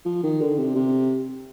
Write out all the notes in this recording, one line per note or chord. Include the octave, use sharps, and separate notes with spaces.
F3
D#3
D3
C3
C3